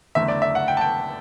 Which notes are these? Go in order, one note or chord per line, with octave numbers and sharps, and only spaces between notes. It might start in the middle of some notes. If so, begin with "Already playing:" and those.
F#1 E2 D3 A3 E5
D5
E5
F#5
G5
A5
G5